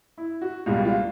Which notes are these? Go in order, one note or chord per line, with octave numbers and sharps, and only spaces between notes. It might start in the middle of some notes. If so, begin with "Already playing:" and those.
E4
F#4
C#2 B2 G3 A#3 F4
F4